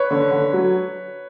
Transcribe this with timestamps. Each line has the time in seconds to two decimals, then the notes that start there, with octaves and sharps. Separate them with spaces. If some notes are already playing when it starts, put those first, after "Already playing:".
Already playing: B4 C#5
0.11 D3
0.31 D3
0.53 F#3